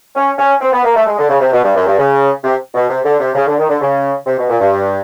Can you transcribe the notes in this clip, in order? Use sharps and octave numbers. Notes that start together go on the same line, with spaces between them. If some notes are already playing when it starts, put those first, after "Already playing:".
C#4
C#4
C4
B3
A#3
A3
G#3
D3
C#3
C3
B2
G2
F#2
G2
C#3
C3
B2
C3
D3
C3
C#3
D3
D#3
D3
C#3
C3
B2
A#2
G2